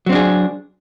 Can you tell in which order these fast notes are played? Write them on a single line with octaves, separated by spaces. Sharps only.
F#3 C4 D4 G#4